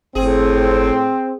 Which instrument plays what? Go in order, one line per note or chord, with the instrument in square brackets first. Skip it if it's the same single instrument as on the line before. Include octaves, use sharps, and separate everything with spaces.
[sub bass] G1 [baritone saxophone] A2 [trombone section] C4 [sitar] G#4